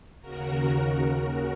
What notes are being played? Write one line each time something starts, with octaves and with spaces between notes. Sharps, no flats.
D#2 C#3 F#4 A#4